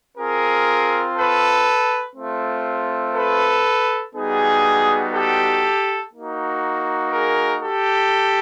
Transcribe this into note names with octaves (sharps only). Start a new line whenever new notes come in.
C4 F4 G#4 A#4
A4 B4
A3 C4 F4
A4 B4
G3 B3 D#4 F#4 G#4
G4 A4
A#3 D#4 F#4
G#4 A#4
G4 A4